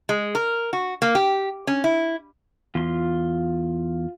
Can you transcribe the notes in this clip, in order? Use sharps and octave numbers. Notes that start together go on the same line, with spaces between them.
G#3
A#4
F#4
A#3
G4
C#4
E4
E2 F4 C6